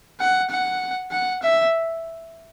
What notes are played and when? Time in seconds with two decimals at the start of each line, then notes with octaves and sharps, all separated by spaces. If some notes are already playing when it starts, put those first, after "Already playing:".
0.20 F#5
0.50 F#5
1.12 F#5
1.43 E5